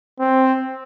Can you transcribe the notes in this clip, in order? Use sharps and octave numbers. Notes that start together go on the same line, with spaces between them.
C4